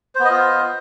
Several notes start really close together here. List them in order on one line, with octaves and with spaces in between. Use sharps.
C5 B3 D#5 F4